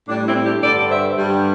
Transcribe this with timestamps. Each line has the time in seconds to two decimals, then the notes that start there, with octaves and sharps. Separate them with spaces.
0.08 A2 G3 D4
0.26 C4 E4
0.44 D4 G4
0.62 G2 D3 G3 A4 D5
0.89 C5 E5
1.16 G2 D3 G3